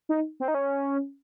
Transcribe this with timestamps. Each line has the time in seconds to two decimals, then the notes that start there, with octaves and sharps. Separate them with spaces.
0.09 D#4
0.40 C4
0.48 D#4
0.54 C#4